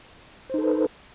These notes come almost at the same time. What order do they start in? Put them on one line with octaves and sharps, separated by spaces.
C5 D#4 A4 B4